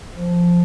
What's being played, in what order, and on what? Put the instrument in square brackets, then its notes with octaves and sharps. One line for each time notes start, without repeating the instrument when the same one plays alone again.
[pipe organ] F3